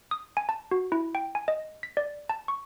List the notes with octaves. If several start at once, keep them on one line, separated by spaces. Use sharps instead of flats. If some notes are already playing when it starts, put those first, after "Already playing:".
D#6
G#5
A5
F#4
E4
G5
G#5
D#5
B6
D5
A5
C#6